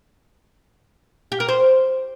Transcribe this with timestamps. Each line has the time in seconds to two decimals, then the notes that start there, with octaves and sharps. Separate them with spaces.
1.32 G4
1.40 A#4
1.48 C5